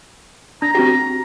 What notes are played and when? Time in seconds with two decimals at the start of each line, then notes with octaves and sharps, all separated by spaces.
0.62 D4 A#5
0.75 C4 F#4 G4